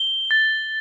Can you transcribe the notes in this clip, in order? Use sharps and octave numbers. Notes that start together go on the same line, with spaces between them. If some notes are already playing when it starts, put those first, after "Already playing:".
Already playing: G7
A6